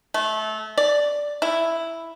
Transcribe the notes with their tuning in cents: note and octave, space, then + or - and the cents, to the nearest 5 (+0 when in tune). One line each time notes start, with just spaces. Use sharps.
A3 -25
D5 +0
E4 +0